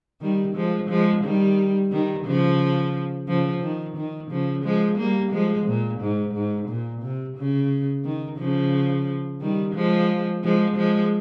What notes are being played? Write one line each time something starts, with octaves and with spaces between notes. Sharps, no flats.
D#3 G3
F3 G#3
F3 G#3
D#3 G3
D#3 G3
C#3 F3
C#3 F3
D#3
D#3
C#3 F3
F3 G#3
G3 A#3
F3 G#3
A#2
G#2
G#2
A#2
C3
C#3
D#3
C#3 F3
D#3 G3
F3 G#3
F3 G#3
F3 G#3